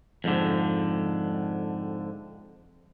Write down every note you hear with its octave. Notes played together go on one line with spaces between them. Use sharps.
F2 G#2 D3